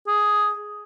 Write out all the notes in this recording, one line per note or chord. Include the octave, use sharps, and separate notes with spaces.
G#4